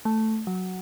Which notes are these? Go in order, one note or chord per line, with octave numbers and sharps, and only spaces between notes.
A3
F#3